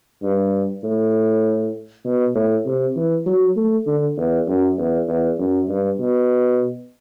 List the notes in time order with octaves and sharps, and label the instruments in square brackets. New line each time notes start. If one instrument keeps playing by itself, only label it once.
[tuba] G2
A2
B2
A2
C3
E3
F#3
A3
D3
E2
F#2
E2
E2
F#2
G2
B2